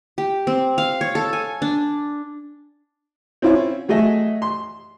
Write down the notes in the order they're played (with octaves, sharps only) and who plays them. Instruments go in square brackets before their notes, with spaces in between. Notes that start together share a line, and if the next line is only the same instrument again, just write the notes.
[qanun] G4
C4
F5
C#5
A4
G#5
D4
[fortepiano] C4 C#4 E4 F4 C#5
F#3 A3 G#4 D#5 E5
C6